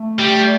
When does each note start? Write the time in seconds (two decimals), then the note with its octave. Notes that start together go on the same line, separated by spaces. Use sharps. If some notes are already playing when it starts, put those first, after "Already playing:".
Already playing: A3
0.19 G3